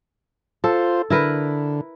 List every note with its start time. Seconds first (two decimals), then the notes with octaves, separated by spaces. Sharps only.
0.64 F4 A4 C5
1.10 D3 E4 A#4 B4